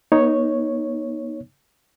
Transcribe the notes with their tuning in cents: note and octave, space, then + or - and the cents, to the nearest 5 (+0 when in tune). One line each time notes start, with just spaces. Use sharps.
B3 -45 D#4 +0 C#5 +0